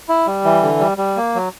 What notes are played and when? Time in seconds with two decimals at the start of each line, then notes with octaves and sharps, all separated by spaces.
0.09 E4
0.27 G3
0.44 E3
0.63 D3
0.80 G3
0.98 G3
1.17 A#3
1.35 F#3